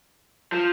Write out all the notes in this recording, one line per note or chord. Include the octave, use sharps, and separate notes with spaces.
F3